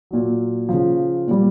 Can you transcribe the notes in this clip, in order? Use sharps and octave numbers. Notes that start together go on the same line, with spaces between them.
A#2 F#3
C#3 F3
A#2 G3